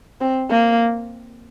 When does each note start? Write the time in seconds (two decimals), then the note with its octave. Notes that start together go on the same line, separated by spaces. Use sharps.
0.21 C4
0.50 A#3